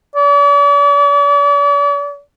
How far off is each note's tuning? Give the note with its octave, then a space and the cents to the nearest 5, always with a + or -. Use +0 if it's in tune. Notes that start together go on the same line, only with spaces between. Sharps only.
D5 -45